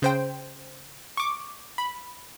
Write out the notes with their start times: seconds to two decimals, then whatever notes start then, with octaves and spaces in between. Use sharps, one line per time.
0.02 C#3 C5 G5
1.17 C#6 D6
1.78 B5